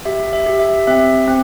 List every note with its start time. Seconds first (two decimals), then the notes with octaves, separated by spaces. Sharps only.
0.05 G4 E5
0.33 E5
0.46 G4
0.59 E5
0.87 C4 E5
1.28 C4